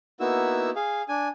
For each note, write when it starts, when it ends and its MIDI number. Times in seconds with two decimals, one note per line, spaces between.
0.20 0.70 58
0.20 0.70 59
0.20 0.70 63
0.20 0.70 64
0.20 0.70 66
0.20 0.70 88
0.76 1.02 68
0.76 1.02 77
1.09 1.28 62
1.09 1.28 80